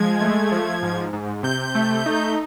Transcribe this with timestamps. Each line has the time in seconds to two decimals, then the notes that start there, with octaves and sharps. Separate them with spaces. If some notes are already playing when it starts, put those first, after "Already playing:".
Already playing: F3 G#3 G#6
0.21 A3
0.51 F3
0.82 G#2
1.13 G#2
1.43 C3 G6
1.75 A3
2.06 D#4